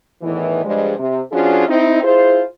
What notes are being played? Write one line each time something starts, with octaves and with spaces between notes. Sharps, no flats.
E2 A2 D#3 E3
G2 F3 G3 G#3
C3
F3 C#4 D4 F4 F#4 G#4
C4 D#4 E4
E4 F4 G#4 C5